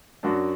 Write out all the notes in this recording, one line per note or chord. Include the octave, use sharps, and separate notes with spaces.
F#2 F#3 D4 F#4